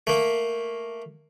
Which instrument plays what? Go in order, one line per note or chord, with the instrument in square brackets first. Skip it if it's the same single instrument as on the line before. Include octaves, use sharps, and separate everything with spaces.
[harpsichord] A3 A#3